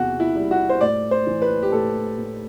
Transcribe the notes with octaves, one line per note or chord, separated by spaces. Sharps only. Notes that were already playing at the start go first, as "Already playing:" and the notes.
Already playing: E2 C3 F#4
E4
G3
F#4
C5
A2 D5
C5
E3
B4
G4
A2 A4
A2